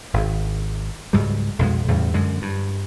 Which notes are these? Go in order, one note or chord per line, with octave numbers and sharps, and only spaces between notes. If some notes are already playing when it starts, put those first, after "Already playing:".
G#1
C#2 G#2 F#3 G3
B1 F2 B2 G#3
E2 A2 C#3 G3
F#2 D3 G#3
G2